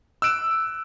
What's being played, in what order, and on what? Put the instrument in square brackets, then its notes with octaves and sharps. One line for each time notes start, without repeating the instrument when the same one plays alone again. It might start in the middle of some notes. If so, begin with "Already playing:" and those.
[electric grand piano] E6 F#6 D7 E7